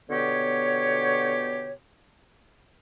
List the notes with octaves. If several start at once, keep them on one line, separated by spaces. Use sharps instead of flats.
B2 D3 B3 G4 C#5